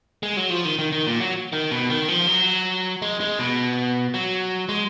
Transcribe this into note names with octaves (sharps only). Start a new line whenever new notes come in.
G#3
F#3
F3
D#3
D#3
D#3
A#2
F#3
D#3
B2
D#3
F3
F#3
G#3
G#3
B2
F#3
G#3